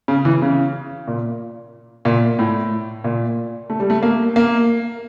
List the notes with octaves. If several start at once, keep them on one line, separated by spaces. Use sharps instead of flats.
C#3
E3
C#3
A#2
A#2
A2
A#2
A3
G3
A3
A#3
A#3